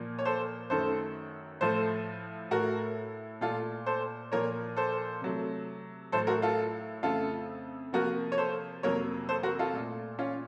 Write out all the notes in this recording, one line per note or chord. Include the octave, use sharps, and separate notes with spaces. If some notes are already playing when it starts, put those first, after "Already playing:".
Already playing: A#2 F3 A#3
C#5
A4 C5
F#2 D#3 A3 A4 C5
A2 F3 A3 A4 C5
A2 A3 F#4 A#4
A#2 A3 F4 A4
A4 C5
A#2 F3 A#3 A#4 C#5
A4 C5
C3 F#3 A3
A2 F#3 A3 A4 C5
F#4 A#4
F4 A4
F2 C#3 A3 F4 A4
C3 F3 A#3 F#4 A#4
C#5
A4 C5
F2 C3 F#3 A#3 A#4 C#5
A4 C5
F#4 A#4
F4 A4
A#2 A3
C#4 F4